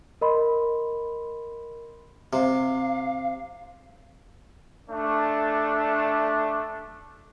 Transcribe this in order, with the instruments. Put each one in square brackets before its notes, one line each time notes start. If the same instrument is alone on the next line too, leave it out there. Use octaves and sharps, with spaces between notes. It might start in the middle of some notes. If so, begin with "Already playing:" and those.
[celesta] A#4 D#5 B5 C6
[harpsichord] C3 [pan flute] F5
[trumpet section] A3 D4